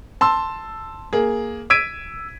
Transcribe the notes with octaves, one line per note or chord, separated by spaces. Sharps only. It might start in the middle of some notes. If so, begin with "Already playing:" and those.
A5 C6 E6
A#3 G#4
E6 G#6 B6 D7 D#7